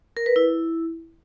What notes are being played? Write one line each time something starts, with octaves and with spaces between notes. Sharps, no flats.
A#4
B4
E4